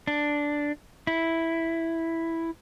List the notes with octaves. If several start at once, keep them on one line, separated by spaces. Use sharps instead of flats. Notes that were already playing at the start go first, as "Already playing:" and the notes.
D4
E4